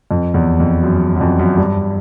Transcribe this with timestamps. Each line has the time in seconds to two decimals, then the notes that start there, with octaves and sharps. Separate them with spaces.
0.11 F2
0.34 E2
0.60 F2
0.83 F#2
1.16 F#2
1.21 F2
1.39 F#2
1.57 G2